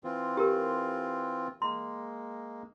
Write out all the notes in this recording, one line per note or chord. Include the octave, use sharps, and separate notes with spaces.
E3 C4 F4
G4 A#4
G#3 A#3 C6